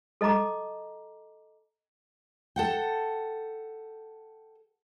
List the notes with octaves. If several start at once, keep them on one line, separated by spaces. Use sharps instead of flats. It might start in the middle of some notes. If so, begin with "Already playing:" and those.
A4 D#5 A5 A#5 D6
A4 F#5 G5